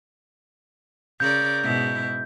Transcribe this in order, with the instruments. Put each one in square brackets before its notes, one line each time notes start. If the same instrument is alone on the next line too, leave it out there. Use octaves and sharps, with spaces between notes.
[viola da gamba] C#3 A#4 D5 [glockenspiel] G6
[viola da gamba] G#2 B2 E4